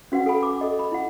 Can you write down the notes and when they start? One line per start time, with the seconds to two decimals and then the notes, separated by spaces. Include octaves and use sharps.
0.12 C#4 F#4 B4 F#5
0.26 A4 G5 G#5 B5
0.43 D6
0.61 A4 D#5
0.79 B5
0.92 E4 F#5